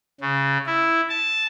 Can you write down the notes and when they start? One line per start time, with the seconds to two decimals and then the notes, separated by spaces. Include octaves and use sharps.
0.21 C#3
0.66 E4
1.09 A5